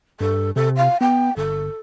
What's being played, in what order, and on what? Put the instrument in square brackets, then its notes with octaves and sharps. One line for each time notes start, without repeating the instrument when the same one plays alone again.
[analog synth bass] G2 [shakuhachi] A4
[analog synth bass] C3 [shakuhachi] A4
[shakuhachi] F5
[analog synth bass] B3 [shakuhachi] G5
[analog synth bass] G1 [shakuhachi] A4